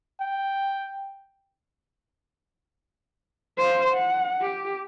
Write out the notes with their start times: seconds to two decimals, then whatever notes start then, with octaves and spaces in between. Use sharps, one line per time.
0.22 G5
3.58 C5 F5
3.92 F#5
4.42 G4